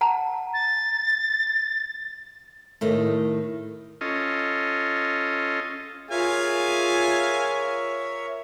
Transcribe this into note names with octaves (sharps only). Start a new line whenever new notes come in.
F#5 A5 A#5
A6
A2 D#3 A3
C#4 F4 A4 D#5
F4 G#4 A#4 C#5 E5 F5 G#5